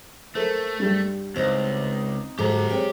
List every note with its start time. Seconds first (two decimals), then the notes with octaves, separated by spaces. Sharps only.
0.35 A3 A4 A#4 C5
0.80 G2 G3
1.36 C#2 C4 D#4
2.39 G#2 F#3 G4 A4 A#5
2.70 G#3 C4 C#5 G5